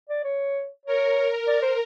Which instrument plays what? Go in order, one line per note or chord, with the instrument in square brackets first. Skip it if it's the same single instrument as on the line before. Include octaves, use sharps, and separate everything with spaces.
[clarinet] D5
C#5
[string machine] A#4 [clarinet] C#5
[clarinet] D5
C5